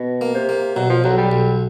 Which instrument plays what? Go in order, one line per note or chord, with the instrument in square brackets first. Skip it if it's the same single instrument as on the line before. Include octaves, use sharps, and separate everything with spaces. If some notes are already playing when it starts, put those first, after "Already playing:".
Already playing: [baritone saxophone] B2
[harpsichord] A#3
[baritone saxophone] C3
[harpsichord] A#3
[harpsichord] B2 [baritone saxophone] F#3
[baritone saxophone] F3
[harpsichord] B1 [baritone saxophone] F#3
[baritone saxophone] G3
[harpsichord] B1